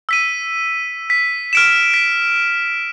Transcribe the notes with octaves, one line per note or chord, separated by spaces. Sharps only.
E6 B6 D#7
B6
F6 D7 E7
B6